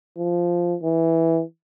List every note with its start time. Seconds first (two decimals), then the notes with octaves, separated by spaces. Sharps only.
0.17 F3
0.83 E3